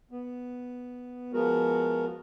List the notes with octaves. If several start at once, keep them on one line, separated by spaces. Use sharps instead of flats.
B3
F3 G#3 B3 F#4 A#4